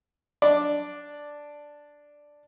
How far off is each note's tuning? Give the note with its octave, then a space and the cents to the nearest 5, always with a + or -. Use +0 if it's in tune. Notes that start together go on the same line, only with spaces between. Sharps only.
D4 +0 D5 +0